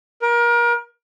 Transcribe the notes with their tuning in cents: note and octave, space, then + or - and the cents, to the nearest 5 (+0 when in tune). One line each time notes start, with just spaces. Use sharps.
A#4 +30